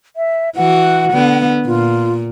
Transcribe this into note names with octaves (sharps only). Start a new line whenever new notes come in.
E5
E3 F#4 F#5
D3 B3
A#2 F4